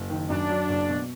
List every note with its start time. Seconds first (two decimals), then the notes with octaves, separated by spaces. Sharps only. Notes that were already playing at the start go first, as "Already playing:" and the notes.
Already playing: F#1
0.10 D#3
0.30 F#2 D4
0.49 F#3
0.69 F#1
0.90 B2